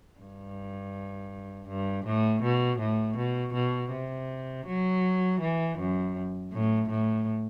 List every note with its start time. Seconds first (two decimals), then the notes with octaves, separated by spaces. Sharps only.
0.19 G2
1.68 G2
2.05 A2
2.43 B2
2.79 A2
3.17 B2
3.54 B2
3.92 C3
4.66 F#3
5.41 E3
5.79 F#2
6.53 A2
6.90 A2